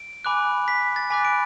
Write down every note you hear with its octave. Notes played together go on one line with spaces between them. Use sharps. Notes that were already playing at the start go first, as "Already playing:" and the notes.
Already playing: D7
G#5 B5 D6 F#6
B6
A6
G#5 B5 D6 F#6 B6
D7